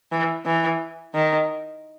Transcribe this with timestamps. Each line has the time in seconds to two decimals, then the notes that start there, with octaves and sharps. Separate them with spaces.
0.12 E3
0.46 E3
1.15 D#3